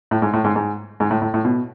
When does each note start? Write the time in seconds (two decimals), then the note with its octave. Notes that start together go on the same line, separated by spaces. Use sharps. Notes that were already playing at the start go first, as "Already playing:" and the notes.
0.11 A2
0.22 G#2
0.33 A2
0.44 G#2
0.56 G#2
1.00 G#2
1.11 A2
1.22 A2
1.34 A2
1.45 B2